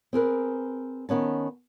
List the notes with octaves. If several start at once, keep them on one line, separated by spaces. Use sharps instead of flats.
C4 G#4 A#4 B4
D#3 B3 C#4 A5